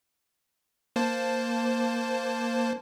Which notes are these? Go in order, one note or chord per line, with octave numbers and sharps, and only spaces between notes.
A#3 C5 A5